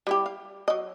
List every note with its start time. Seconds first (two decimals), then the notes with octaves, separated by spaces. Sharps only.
0.07 G3 E4 G4
0.26 F5
0.68 F#3 D#5